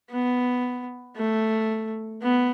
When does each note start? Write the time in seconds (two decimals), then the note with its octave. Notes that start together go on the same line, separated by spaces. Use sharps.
0.10 B3
1.16 A3
2.22 B3